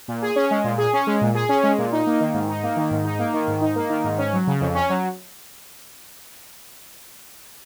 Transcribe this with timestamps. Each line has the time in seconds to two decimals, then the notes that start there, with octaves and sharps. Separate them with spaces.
0.08 A#2
0.22 G#4
0.36 C#4
0.51 G#3
0.64 A#2
0.78 G#4
0.93 C#4
1.07 G#3
1.21 A#2
1.35 G#4
1.49 C#4
1.63 G#3
1.78 A#2
1.92 D#4
2.07 A#3
2.20 D#3
2.34 G#2
2.48 D#4
2.63 A#3
2.76 D#3
2.91 G#2
3.05 D#4
3.19 A#3
3.33 D#3
3.48 G#2
3.61 D#4
3.76 A#3
3.90 D#3
4.04 G#2
4.18 C#4
4.33 F#3
4.47 C#3
4.61 F2
4.75 C#4
4.90 F#3